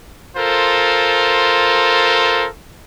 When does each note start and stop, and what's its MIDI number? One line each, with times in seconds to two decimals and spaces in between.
0.36 2.48 65
0.36 2.48 69
0.36 2.48 70
0.36 2.48 72